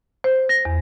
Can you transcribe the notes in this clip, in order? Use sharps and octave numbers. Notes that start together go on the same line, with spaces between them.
C5
A#6
E2